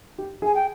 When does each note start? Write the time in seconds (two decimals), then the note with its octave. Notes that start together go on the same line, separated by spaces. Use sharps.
0.18 G4
0.42 G#4
0.46 G#5
0.55 G5